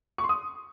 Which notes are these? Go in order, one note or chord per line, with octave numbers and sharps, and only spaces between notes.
C#6
C6
D#6